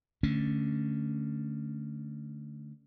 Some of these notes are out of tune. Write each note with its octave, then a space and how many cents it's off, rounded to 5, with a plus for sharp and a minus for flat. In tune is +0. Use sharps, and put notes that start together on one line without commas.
D3 +0 A3 +0 C#4 +0